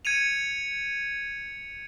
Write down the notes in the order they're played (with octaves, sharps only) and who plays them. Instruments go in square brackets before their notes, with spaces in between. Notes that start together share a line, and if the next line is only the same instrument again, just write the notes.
[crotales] G#6 C#7 D#7 F7